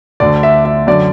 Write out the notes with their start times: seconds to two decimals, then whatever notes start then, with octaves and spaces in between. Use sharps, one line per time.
0.20 D2 D3 D5
0.43 E5
0.65 E5
0.87 F#2 D3 D5